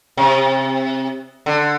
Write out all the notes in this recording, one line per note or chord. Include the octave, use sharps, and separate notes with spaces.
C3
D3